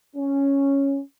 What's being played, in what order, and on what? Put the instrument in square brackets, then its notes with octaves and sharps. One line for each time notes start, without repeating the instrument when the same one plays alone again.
[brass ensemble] C#4